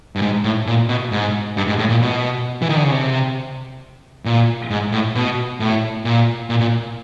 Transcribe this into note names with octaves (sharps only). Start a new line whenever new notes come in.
G2
G#2
A2
A#2
B2
G#2
G2
G#2
A2
A#2
B2
E3
D#3
D3
C#3
C3
A#2
G#2
A2
B2
A2
A#2
A#2
A#2